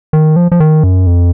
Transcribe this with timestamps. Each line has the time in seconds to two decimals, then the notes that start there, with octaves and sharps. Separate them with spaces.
0.13 D#3
0.36 F3
0.52 F3
0.60 D#3
0.84 F#2
1.07 F2